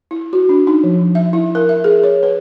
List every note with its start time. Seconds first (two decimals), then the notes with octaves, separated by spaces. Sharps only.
0.11 E4
0.33 F#4
0.49 D4
0.67 D#4
0.84 F3
1.15 E5
1.33 E4
1.55 A#4
1.69 E5
1.84 G#4
2.04 C#5
2.23 B4